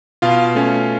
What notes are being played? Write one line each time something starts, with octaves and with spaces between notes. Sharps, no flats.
B2 F4 F5
A3 C#4